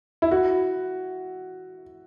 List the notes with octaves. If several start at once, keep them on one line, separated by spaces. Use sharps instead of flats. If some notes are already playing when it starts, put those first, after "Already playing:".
E4
F#4